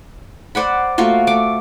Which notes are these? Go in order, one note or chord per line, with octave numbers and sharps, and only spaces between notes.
C5 D5 F#5 B5
A3 A#3 F4 F#4
A3 D6